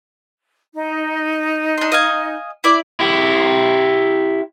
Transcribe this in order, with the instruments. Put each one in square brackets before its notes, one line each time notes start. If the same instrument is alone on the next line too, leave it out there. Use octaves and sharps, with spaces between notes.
[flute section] D#4
[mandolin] D4 C6
D#5 F5 G#5
E4 D5
[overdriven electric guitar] E4 G4